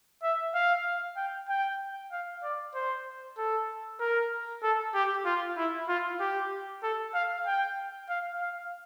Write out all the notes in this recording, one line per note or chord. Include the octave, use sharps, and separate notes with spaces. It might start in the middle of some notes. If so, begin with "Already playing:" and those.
E5
F5
G5
G5
F5
D5
C5
A4
A#4
A4
G4
F4
E4
F4
G4
A4
F5
G5
F5
F5